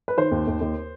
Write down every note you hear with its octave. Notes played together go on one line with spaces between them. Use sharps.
B4
D#3 C5
D#2
D#2
D#2